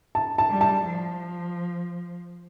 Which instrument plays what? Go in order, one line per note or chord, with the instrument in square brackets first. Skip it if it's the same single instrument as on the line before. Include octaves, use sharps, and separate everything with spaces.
[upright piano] A5
A5
[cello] G3
[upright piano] A5
[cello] F3